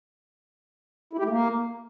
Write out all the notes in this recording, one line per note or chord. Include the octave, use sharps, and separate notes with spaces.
E4
G4
A3
A#3